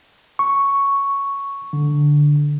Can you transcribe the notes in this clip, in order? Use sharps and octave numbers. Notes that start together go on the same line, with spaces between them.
C#6
D3